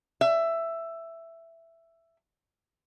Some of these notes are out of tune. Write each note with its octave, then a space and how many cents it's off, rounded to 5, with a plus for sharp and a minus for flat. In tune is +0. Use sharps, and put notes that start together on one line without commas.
E5 +10